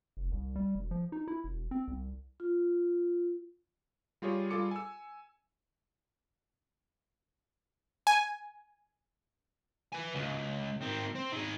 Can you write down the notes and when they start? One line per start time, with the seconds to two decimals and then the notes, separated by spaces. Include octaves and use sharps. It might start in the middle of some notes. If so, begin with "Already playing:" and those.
0.17 F1
0.32 C2
0.56 G3
0.75 E1
0.91 F3
1.12 D#4
1.28 E4
1.44 E1
1.71 C4
1.88 C2
2.40 F4
4.22 G3 F4 G4 G#4 C#5
4.50 G3 F4 G#4 A4 D6 C#7
4.71 G#5 E6
8.07 G#5
9.92 B4 G#5
10.15 C#2
10.82 D#3 C4
11.15 C4
11.32 D#3 G#4